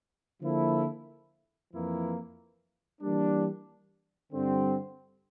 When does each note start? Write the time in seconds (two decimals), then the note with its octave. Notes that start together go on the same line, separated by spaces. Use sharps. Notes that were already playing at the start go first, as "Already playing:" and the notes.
0.40 D3 F3 A#3 E4 A4
1.71 F2 E3 A#3 E4
3.01 E3 G3 A#3 D4
4.32 G2 D3 G3 C4